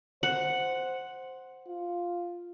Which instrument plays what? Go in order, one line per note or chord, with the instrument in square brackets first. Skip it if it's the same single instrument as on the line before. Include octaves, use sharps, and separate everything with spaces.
[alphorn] C5 [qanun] F#5
[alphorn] F4